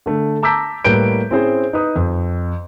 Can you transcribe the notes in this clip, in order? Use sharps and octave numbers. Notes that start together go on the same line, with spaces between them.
D3 A3
A5 A#5 D6 E6 G6 B6
A2 G3 A#3 B4 G6 D7
C4 C#4 E4 G#4 C5
D#4 B4 D#6
F2